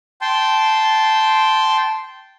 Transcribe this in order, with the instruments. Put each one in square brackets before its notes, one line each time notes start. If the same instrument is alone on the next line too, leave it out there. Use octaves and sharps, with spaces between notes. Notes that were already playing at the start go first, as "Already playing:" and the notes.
[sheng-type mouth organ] G5 A5 C6